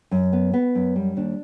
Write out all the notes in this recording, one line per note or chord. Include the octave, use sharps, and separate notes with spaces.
F#2
B3
B3
F#2
G3
D#2 D4